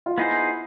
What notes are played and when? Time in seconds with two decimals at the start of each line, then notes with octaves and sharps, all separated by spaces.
0.06 F4
0.17 B3 D#4 E4 G#4 C5